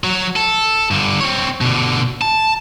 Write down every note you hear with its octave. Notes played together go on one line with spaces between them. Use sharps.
F#3
A4
G2 D3
C4 C#5
B2 D3
A5